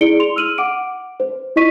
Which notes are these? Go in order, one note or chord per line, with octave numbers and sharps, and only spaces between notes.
E4 G#4 D5 C#7 D7 G7
C6 F7
E6 F6 D#7 F#7
F#5 D6 D7
C5
E4 F4 D#5 C#6 B6 D#7